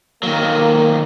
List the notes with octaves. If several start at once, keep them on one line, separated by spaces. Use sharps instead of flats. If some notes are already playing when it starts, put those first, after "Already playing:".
D#3 F#3 A#3